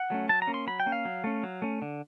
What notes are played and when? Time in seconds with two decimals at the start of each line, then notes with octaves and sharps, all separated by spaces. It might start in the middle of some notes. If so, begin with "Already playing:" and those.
Already playing: F#5
0.10 F#3 A3 C#4
0.29 F#3 A5
0.42 A#5
0.47 A#3 C#4
0.54 C6
0.67 F#3 B5
0.80 G5
0.86 A#3 C#4
0.92 F5
1.05 F#3
1.24 A3 C#4
1.43 F#3
1.62 A3 C#4
1.82 D3